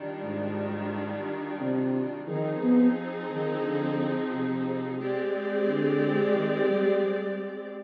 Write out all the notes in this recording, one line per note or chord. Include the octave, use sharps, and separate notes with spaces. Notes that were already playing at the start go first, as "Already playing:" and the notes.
Already playing: D#3 G3 D4 F4
G#2
C3
D#3 F3 C4 D#4 G#4
B3
D#3
D3
C3
G#3 C4 G4 D5
D3
D#3
G3
G3